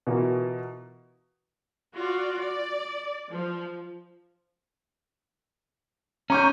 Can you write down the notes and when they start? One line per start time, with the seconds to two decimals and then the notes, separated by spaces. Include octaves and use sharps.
0.07 B2 E3 F4 F#4 A#4
1.95 F4 F#4 D5
2.39 D5
3.30 F3
6.30 C#4 A#5 C#6 G6